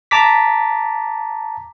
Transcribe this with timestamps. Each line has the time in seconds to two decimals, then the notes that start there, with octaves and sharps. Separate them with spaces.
0.11 A5 A#5 D6 B6